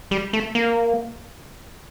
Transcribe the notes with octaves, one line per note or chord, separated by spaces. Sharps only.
G3
A3
A#3